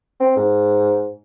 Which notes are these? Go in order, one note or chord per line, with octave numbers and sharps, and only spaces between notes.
C4
G#2